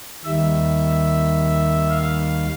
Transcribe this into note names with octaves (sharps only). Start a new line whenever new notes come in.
D#2 D#3 G3 E5
F5